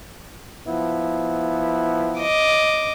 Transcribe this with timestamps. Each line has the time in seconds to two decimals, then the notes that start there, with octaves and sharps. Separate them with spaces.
0.67 F3 B3 E4
2.20 D#5 D6